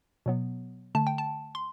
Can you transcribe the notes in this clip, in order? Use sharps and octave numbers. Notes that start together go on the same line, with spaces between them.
B2 F#3 B3
D3 A3 A5
G5
A5
C6